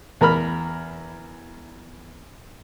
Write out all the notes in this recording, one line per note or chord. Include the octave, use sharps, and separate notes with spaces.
E2 A#4 B5 F6